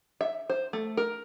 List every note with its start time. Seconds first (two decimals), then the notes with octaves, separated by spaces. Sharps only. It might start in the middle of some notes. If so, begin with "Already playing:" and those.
0.21 E5
0.50 C5
0.73 A3
0.97 A#4